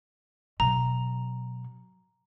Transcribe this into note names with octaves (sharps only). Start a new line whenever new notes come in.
B2 F#3 A#5